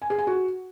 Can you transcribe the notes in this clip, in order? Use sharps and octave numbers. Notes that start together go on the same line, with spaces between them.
G#5
G#4
G#5
F#4